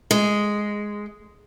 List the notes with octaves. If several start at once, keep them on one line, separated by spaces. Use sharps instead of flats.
G#3